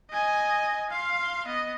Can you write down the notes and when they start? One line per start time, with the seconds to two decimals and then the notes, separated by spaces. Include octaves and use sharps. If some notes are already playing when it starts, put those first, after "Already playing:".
0.11 D#5 G#5
0.90 F5 C6
1.46 B3 D#5